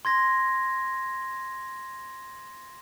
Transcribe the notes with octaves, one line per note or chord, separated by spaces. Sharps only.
C6 G#6 A#6